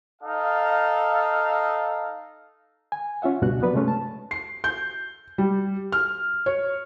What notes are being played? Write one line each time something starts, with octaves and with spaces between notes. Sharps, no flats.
D#4 A4 F5
G#5
C#4 F4 E5 F#5
C#2 G2 B2 D4 F#4 F#6
F3 F#3 B3 B4 D5
C3 G#3 A3 C#4
A5
C7
G6
G3
F6
C#5